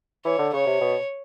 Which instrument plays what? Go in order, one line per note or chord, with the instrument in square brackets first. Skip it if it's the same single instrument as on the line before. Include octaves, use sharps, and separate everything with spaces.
[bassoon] E3 [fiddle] C#5
[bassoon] D3
[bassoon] C#3 [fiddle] C#5
[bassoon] C3
B2